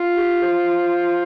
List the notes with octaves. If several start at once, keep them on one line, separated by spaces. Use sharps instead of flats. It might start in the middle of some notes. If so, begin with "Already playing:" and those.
Already playing: F4
G4
C5